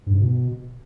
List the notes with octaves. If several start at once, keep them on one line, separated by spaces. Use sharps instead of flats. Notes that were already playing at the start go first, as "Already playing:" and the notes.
G2
G#2
B2